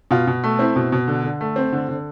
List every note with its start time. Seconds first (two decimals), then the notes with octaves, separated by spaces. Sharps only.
0.11 B2 F4
0.27 B2
0.43 A3
0.59 C4 E4
0.76 B2
0.92 B2
1.08 D3
1.24 D3
1.41 A3
1.56 C4
1.72 D3
1.89 D3